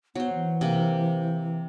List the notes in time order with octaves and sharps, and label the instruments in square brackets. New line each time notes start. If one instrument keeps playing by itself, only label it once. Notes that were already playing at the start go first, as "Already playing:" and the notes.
[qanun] F#3 C5 [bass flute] B3
[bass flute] E3
[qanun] C3 A#3